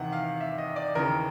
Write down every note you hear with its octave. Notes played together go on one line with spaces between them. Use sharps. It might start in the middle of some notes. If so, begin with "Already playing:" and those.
Already playing: E2 C3 D#3 F#5
F5
E5
D#5
D5
D#2 C#3 E3 A#4